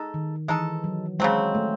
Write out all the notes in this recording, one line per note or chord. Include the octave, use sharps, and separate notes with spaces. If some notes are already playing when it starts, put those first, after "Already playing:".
Already playing: G#3 D#4 A4
D#3
E3 G#3 D#4 A4
F#3
C#3 F#3 G#3 C4
A3